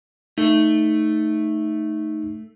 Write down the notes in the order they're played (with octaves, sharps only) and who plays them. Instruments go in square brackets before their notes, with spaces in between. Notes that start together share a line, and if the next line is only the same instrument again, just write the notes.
[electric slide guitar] A3 [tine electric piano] D#4